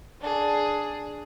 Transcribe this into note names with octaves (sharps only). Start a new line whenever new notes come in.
D4 G#4